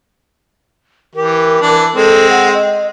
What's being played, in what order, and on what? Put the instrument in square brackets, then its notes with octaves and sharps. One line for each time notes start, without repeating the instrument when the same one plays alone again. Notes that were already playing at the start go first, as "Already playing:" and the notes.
[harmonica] E3 G4 [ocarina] A#4
[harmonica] E3 D4
[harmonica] G#3 C4 [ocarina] A4
[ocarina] F#5
D#5